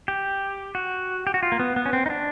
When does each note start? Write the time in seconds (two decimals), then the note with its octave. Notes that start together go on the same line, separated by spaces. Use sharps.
0.08 G4
0.75 F#4
1.27 G4
1.34 F#4
1.43 F4
1.52 A#3
1.60 B3
1.76 B3
1.86 C#4
1.93 C4
2.06 D#4
2.10 D4